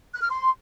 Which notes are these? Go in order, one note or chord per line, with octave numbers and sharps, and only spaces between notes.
F#6
F6
C6